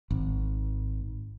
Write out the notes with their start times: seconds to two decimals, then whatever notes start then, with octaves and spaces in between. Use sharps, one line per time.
0.11 G#1